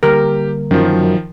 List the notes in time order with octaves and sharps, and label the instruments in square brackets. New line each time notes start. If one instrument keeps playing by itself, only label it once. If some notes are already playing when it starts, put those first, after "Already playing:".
[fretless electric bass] D3 G3 A#3 [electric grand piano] G4 [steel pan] A#4
[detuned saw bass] F#2 [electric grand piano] D#3 F3